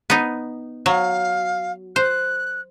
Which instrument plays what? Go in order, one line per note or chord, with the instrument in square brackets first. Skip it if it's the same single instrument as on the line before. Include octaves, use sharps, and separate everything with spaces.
[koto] B3 D#4
[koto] F#3 [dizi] F5
[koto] C5 [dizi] F#6